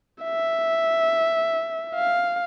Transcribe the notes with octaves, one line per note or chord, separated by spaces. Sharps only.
E5
F5